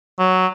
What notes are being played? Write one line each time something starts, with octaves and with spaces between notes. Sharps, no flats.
F#3